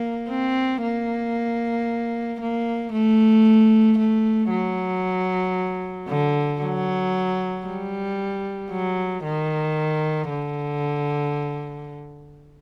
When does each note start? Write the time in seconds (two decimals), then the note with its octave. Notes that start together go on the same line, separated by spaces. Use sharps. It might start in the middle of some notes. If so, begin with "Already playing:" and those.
Already playing: A#3
0.29 C4
0.82 A#3
2.41 A#3
2.93 A3
3.98 A3
4.50 F#3
6.08 D3
6.62 F#3
7.67 G3
8.71 F#3
9.24 D#3
10.30 D3